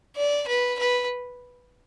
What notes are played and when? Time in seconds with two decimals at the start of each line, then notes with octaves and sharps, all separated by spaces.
0.16 D5
0.47 B4
0.79 B4